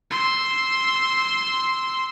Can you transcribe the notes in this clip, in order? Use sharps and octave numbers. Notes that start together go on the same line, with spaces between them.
C6 E6